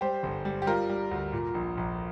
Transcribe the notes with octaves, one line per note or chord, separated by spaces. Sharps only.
G3 G4 C5
G1
G3
G4
G3 F4 A#4
G3
D2
A#2
A#1
A#1